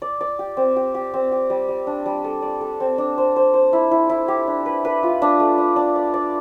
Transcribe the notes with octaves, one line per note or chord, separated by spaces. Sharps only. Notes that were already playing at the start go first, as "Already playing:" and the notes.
D5
D5
G4
C4
G4
G4
C4
G4
G3
G3
D4
G3
A4
D5
A4
C4
D4
C5
C5
C5
E4
E4
E4
G4
D4
B4
B4
F4
D4
A3
D4
D4
D5
D5